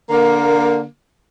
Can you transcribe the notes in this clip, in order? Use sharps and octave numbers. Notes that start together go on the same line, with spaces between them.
D3 A#3